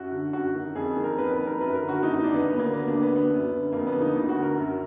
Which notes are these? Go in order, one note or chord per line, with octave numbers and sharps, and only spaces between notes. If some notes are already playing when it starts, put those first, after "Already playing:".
Already playing: F#2 F#4
D3
F#2 F#4
D#3
F2 G#4
D#3
A#4
F2 B4
B4
D#3
A#4
F#2 B4
A#4
D3
F#4
F#2 D#4
D#4
D#3 D4
B3
D2 B3
A#3
D3
B3
D2 D4
B3
D3
B3
F#2
D3
F2 A#3
B3
D3
D#4
D2
F#4
D3
A#4
F#2